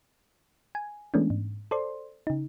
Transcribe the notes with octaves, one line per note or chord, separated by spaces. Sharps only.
G#5
E3 G#3 A3 B3 C#4 D4
G#2
A4 C5 D5 C6
C#3 D#4